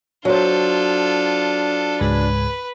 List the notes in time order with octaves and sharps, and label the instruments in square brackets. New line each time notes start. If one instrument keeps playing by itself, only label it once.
[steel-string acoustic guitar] F#3 C5 [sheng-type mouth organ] D4 [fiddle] F4 A4
[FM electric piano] C#2 G#2 G#3 [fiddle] B4